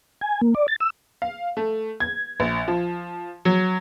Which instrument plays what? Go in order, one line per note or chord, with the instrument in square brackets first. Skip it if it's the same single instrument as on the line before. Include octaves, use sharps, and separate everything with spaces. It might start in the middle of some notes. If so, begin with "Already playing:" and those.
[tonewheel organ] G#5
A#3
D5
A6
E6
[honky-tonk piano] F5
A3
G#6
A#1
F3
F#3